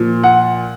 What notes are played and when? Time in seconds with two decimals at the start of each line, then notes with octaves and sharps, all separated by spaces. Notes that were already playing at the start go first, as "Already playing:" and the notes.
Already playing: A#2 F3
0.24 F#5